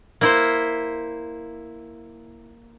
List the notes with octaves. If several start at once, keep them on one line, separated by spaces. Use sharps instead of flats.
A#3 E4 C5